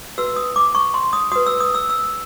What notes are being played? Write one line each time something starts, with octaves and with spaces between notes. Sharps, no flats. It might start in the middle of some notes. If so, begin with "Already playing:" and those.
F#4 B4 E6
D#6
D6
C#6
C6
D#6
F#4 B4 D#6
E6
D#6
E6
E6